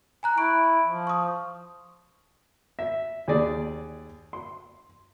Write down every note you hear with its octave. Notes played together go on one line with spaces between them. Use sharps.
G#5 A#5 F#6
E4 C#6 D7
F3
C#6 D#6
E5
D#2 G#4 D5
C6